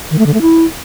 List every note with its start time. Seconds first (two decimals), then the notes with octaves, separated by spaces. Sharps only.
0.11 D#3
0.19 A3
0.26 D3
0.34 A3
0.41 E4